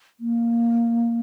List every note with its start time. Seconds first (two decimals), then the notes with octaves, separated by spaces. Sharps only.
0.20 A#3